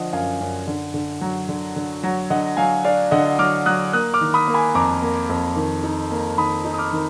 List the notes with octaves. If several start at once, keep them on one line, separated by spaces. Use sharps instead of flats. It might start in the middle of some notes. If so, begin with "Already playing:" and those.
Already playing: D3 F3 D5 D#5 F#5
F#2 F5 G#5
F#2
D3
D3
F#3
D3
D3
F#3
D3 D#5 F#5
F#3 F5 G#5
D4 D5 F5
D3 D#5 F#5
F#3 D6 F6
F#3 D#6 F#6
A#3 D#6 F#6
D6 F6
D#3
B5 D#6
A#3
G#5 B5
F2 A#5 D6
A#3
F2
D#3
D#4
A#3
D#3 B5 D#6
D#4
D#6
D6 F6
D#3